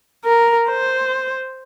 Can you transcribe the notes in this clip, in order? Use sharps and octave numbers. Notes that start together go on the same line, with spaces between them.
A#4
C5